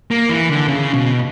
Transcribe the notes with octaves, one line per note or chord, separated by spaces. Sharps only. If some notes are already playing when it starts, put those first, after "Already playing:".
A#3
E3
D3
C#3
B2